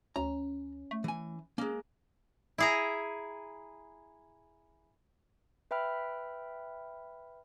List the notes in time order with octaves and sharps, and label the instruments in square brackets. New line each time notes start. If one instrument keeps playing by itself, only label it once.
[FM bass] D2 [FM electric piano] C#4 [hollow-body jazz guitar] A#5
[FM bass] A3
[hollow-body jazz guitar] E3 G#5
[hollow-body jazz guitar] G#3 A#3 [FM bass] C#4
[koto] E4 G#4 A#5
[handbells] B4 E5 G5 B5 F6